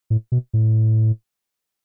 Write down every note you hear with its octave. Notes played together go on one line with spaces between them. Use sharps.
A2
B2
A2